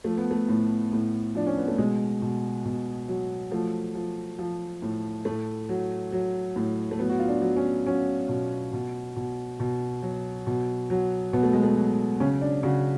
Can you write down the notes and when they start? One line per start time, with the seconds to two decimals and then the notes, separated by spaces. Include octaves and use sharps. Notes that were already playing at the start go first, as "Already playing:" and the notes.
0.04 F3 A3
0.18 B3
0.31 A3
0.49 A2
0.92 A2
1.35 F3 D4
1.47 C#4
1.57 B3
1.68 A3
1.78 B2 G#3
2.22 B2
2.65 B2
3.08 F#3
3.51 F3 A3
3.95 F3
4.39 F3
4.82 A2
5.25 A2 A3
5.69 F#3
6.12 F#3
6.56 A2
6.91 A3
6.99 F#3 B3
7.10 F#4
7.19 F4
7.28 D4
7.42 F#3
7.57 C#4
7.86 F#3 C#4
8.29 B2
8.73 B2
9.16 B2
9.60 B2
10.03 F#3
10.47 B2
10.90 F#3
11.33 B2 B3
11.43 A3
11.53 G#3
11.63 A3
11.77 F#3
12.20 C#3 C#4
12.41 D4
12.63 C#3 F#4